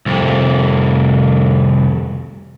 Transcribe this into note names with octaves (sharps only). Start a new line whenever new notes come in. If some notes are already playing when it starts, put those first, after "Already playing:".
C2 F2